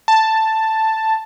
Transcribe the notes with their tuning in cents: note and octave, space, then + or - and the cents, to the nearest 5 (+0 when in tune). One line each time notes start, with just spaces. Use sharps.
A5 +5